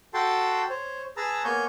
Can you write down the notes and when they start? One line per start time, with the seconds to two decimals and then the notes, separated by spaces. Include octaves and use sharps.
0.14 F#4 A4 G5 A5 C6
0.69 C5 C#5
1.17 G#4 B4 A5 A#5 E6
1.45 A#3 B3 C#5 G#5 C#6 G6